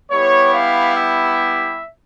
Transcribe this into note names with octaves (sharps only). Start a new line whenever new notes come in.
G3 B3 E4 G4 C#5
F5
E5